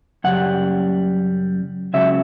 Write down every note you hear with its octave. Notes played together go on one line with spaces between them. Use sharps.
F#2 C#3 G3 F#5
C#2 C#3 F#3 E5